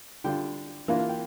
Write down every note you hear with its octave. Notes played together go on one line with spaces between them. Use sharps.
D3 G3 D4 F4 G5
E3 A#3 D4 F4 F5
F5
G5